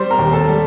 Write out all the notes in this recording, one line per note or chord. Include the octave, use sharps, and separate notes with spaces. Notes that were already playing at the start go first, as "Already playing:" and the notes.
Already playing: G3 C5 C6
A#4 A#5
D#2
A4 A5
G3